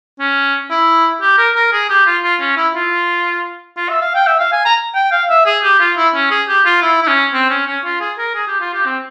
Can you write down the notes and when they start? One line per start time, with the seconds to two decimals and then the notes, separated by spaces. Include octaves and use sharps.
0.20 C#4
0.71 E4
1.21 G4
1.38 A#4
1.56 A#4
1.73 G#4
1.90 G4
2.06 F4
2.23 F4
2.40 C#4
2.57 E4
2.74 F4
3.77 F4
3.89 E5
4.02 F5
4.15 G5
4.27 E5
4.39 F5
4.52 G#5
4.66 A#5
4.95 G5
5.12 F5
5.30 E5
5.46 G#4
5.63 G4
5.79 F4
5.97 E4
6.14 C#4
6.31 G#4
6.48 G4
6.65 F4
6.82 E4
7.02 E4
7.07 C#4
7.33 C4
7.50 C#4
7.67 C#4
7.84 F4
8.00 G#4
8.18 A#4
8.35 G#4
8.48 G4
8.60 F4
8.74 G4
8.86 C4